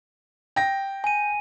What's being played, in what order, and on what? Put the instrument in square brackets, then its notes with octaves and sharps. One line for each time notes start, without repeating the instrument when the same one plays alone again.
[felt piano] G5 A#6
[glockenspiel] G#5 D#7